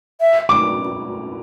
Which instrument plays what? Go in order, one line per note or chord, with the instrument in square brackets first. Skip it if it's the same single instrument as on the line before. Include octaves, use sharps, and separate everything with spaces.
[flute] E5
[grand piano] D6